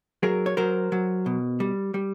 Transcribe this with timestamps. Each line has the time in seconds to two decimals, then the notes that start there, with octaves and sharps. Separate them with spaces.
0.23 F#3 G#4 A#4
0.46 C#5
0.57 F#3 A#4 C5
0.92 F#3
1.26 B2
1.60 G3
1.94 G3